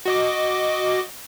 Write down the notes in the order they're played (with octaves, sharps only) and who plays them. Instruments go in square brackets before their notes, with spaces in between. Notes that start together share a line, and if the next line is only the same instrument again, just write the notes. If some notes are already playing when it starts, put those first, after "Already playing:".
[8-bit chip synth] F#4 D#5 D6